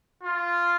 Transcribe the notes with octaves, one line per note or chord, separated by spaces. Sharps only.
F4